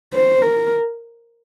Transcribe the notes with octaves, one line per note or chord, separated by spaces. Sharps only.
C5
A#4